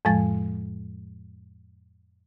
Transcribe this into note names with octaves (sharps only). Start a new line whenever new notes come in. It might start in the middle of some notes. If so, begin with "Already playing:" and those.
F2 A2 F3 G#3 A6